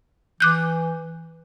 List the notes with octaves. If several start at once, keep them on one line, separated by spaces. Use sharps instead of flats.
E3 D6 F#6 G6